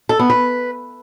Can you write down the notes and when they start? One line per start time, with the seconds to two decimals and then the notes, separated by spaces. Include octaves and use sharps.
0.09 A4
0.19 B3
0.30 B4